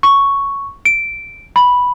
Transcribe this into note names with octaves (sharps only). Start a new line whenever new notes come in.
C#6
D7
B5